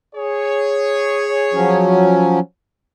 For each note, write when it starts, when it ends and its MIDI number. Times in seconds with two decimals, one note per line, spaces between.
0.15 2.04 68
0.15 2.04 73
1.54 2.40 53
1.54 2.40 54
1.54 2.40 61